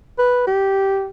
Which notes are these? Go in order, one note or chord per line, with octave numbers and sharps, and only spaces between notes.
B4
G4